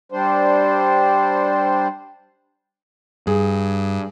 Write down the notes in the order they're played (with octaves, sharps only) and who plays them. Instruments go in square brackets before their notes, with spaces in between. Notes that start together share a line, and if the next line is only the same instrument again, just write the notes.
[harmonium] G3 D4 C5
[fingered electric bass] G2 [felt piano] G#4